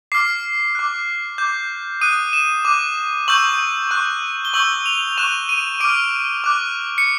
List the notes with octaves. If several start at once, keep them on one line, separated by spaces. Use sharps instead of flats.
D6 F6 C7
D6 F#6
D6 G6
D#6 F#6 D#7
E7
D6 F#6
C#6 E6 G6 F#7
C#6 F#6
G7
C#6 E6 G6 F#7
F7
C#6 F#6 E7
D#7
D6 F6 D7
D6 F#6
C#7